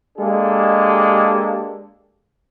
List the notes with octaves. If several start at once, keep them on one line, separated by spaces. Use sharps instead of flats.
G#3 A#3 D4 G4 A4